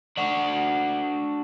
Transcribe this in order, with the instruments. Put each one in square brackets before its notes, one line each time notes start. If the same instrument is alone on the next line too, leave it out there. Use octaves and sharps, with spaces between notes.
[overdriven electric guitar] D4 F#4